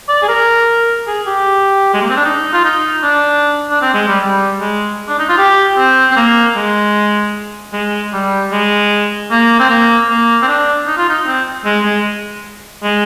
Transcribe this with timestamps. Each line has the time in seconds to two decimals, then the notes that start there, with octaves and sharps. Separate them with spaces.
0.09 D5
0.23 G#4
0.28 A#4
1.07 G#4
1.27 G4
1.94 G#3
2.02 A#3
2.09 C4
2.17 D4
2.25 D#4
2.53 F4
2.64 D#4
3.03 D4
3.71 D4
3.82 C4
3.94 G#3
4.08 G3
4.20 G3
4.60 G#3
5.09 D4
5.19 D#4
5.29 F4
5.38 G4
5.78 C4
6.11 C4
6.17 A#3
6.56 G#3
7.73 G#3
8.13 G3
8.52 G#3
9.31 A#3
9.59 C4
9.69 A#3
10.09 A#3
10.42 C4
10.47 D4
10.87 D#4
10.98 F4
11.09 D#4
11.27 C4
11.65 G#3
11.85 G#3
12.83 G#3